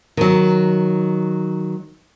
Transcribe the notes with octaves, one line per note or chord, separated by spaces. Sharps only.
D#3 F#3